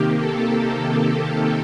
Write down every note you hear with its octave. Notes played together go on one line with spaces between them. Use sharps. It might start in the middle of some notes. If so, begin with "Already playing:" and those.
Already playing: C3 D#3 A#3 G4
A4